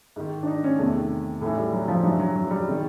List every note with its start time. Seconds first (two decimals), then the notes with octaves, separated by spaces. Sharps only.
0.16 G#2 D#3
0.43 D4
0.47 D#4
0.64 C#4
0.78 E2 C3 D#3 A3
1.41 A2 E3 A3
1.57 G3
1.73 F#3
1.88 F3
2.03 G2 F#3
2.07 E3
2.19 F#3
2.35 F#3
2.47 F#3
2.50 G3
2.65 G#3
2.69 C3 D#3